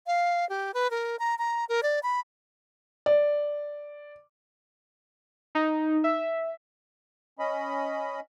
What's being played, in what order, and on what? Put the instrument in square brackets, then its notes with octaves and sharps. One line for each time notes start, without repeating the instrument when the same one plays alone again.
[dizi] F5
G4
B4
A#4
A#5
A#5
A#4
D5
B5
[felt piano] D5
[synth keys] D#4
E5
[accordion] C#4 D#5 B5